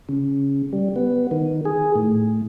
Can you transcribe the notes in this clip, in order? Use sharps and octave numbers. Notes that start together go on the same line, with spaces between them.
C#3
G3
B3
D#3
G#4
A2